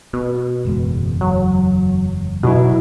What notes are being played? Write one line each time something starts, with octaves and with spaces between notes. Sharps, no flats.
B2
F#1 E2 G#3
F#3
B2 F#3 E4